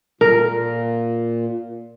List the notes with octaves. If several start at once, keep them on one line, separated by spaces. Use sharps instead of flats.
A#2 A#4